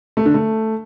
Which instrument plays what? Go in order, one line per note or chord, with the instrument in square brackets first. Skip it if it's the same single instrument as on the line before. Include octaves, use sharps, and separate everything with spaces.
[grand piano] A3
D3
A3